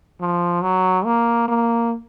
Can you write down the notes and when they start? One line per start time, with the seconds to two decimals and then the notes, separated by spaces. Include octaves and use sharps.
0.20 F3
0.62 F#3
1.05 A#3
1.48 A#3